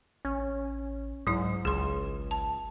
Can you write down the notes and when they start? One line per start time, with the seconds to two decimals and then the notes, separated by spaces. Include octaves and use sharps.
0.25 A1 C#4
1.27 C2 G#2 F#3 E4
1.65 G#1 C#2 G#4 C6
2.31 A5